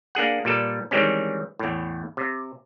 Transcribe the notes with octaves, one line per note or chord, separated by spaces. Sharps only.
A#3 D4 G#4 F#5
A#2 G3 A4 B4
D#3 E3 G3 G#3 C4 C#4
E2 A2
C3